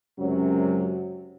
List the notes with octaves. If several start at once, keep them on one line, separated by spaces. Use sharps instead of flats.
C#2 F#2 C3 F#3